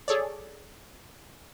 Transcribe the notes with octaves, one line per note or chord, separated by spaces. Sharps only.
G#4 A4 C#5 D5